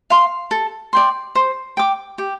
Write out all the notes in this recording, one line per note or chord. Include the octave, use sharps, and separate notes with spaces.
F5 C6
A4
D5 G5 C6
C5
G5 D6
G4